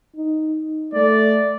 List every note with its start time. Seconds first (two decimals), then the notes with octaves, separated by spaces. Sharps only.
0.16 D#4
0.94 A3 D5